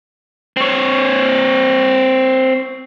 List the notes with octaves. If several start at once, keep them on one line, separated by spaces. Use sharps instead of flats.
C4 C#5